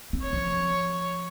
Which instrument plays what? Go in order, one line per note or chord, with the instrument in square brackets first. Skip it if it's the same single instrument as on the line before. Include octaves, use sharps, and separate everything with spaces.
[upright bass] C4
[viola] C#5
[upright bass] F3